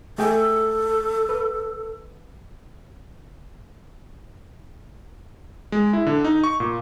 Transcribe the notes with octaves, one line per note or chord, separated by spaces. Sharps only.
A3 G#4 A4 G5
B4
G#3
E4
D3
D#4
C#6
A#2